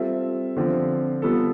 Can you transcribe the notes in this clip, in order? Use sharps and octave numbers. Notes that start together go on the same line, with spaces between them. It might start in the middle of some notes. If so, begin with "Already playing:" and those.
Already playing: G3 C4 F4 A4 E5
D3 F3 C4 F4
G3 B3 F4 A4